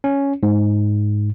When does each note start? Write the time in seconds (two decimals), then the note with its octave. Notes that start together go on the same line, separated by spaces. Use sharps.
0.04 C#4
0.43 G#2